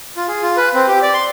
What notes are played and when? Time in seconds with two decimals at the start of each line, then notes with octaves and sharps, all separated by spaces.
0.17 F4
0.28 G#4
0.42 F4
0.57 B4
0.74 C4
0.88 G4
1.02 D5
1.14 C6